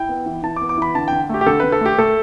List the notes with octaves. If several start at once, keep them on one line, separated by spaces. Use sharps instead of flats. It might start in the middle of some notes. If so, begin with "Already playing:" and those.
Already playing: E4 G5
B3
E3
E3 A5
D6
B3
D6
E3 B5
D3 A5
D3 G5
A3 G4
G4
D3 A4
D3 B4
A4
A3 G4
A3 A4